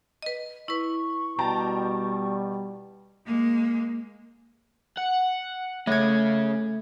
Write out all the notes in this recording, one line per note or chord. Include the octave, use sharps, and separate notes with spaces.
B4 D#5
E4 B4 C#6
B2 G3 G5 A5 A#5
G#3 A#3
F#5
C#3 A3 C#4 G#6